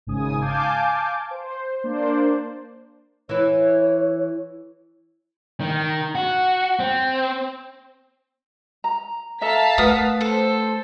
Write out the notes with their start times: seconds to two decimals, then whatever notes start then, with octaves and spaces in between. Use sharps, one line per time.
0.07 G#1 G#2 C#3 G#5 D#6
0.41 F5 G#5 A5 D6 G6
1.31 C5
1.84 A#3 D4 C5 D5
3.29 E3 E4 C#5
5.60 D#3
6.15 F#4
6.79 C4
8.84 A#5
9.41 A4 E5 F5 A5 A#5 B6
9.78 A3 A#4 B4 F#5 D#6
10.21 A4 C5